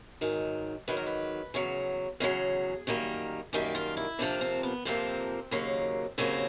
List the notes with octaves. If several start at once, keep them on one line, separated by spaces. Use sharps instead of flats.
G#2 D#3 F#3
G#2 D#3 F#3 B4
A#4
B4
E2 C#3 F#3
E2 C#3 F#3 G#4
F#2 D#3 G3 A#3
F#2 D#3 G3 A#3 G4
F4
E4
F2 C3 F3 A#3 D4
C4
B3
F2 C3 F3 A#3 C4
D#2 C#3 F#3 A#3
D#2 C#3 F#3 A#3 C4